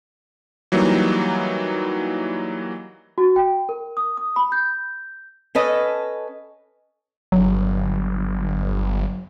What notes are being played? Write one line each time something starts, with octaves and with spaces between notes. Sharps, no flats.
E3 F#3 G3 A#3 D#4
F#4
G5
A#4
D#6
D#6
B5
G6
C#4 A4 B4 D#5
G1 F#3